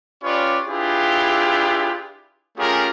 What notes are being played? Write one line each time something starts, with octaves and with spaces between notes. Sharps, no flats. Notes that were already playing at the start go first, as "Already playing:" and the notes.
C#4 F4 G4 B4 C#5 D5
D4 E4 F4 G4 G#4 B4
A3 C#4 F4 G4 G#4 A#4